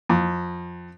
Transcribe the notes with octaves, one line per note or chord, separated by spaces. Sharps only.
F2